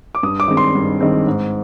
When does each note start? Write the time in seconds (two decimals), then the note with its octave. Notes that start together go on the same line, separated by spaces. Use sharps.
0.15 D6
0.23 G2 D#6
0.40 D6
0.48 D#3 G#3 C4
0.57 C6
0.75 G2
1.01 D#3 G#3 C4
1.27 G#2